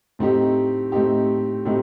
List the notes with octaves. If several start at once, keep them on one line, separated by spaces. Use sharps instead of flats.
A2 A3 C4 D#4 G4
A2 A3 C4 D#4 G4
A2 A3 C4 D#4 G4